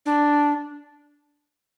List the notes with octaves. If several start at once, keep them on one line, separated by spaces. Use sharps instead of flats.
D4